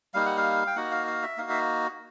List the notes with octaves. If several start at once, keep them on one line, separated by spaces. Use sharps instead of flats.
G3 A#3 D#4 F5
F#5
F5
G5
A#3 D#4 F#4 F#5
F5
F5
E5
A#3 D#4 F#4 F5
E5